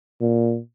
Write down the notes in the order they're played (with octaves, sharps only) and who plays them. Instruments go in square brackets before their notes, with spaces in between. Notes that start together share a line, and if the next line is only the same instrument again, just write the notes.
[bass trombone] A#2